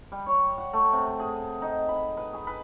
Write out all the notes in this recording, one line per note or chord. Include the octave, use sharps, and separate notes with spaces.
G3
C#5
F#5
A3
C3
G#4
D#4
B5
B4
G#4
B4